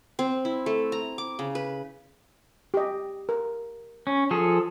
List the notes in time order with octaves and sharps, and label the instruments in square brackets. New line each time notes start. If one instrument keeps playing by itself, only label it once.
[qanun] C4
E4
A3
A#5
D6
C#3
B4
[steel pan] G4 D#5
A#4
[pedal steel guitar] C#4
F3 G#4 A4